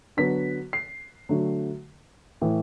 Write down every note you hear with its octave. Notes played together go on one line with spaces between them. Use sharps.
D3 F#3 B3 B6
C7
D3 F#3 A3
A2 E3 A3